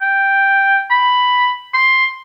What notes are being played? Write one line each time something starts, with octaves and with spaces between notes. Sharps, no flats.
G5
B5
C6